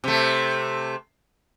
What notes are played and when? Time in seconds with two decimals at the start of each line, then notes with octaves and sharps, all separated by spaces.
0.04 C3 A3